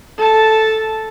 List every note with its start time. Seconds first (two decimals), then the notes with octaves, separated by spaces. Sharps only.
0.18 A4 A5